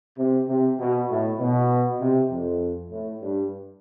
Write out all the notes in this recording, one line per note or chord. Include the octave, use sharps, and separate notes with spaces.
C3
C3
B2
A2
B2
C3
F2
A2
G2